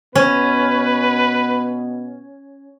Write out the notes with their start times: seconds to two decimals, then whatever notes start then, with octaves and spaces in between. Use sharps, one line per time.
0.15 B2 B3 C#4 B4